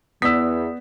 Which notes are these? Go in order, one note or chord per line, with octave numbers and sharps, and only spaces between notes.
E2 B3 D5 D#6 E6 B6